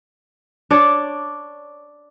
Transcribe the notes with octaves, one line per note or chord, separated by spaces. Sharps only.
D4 C#5 D5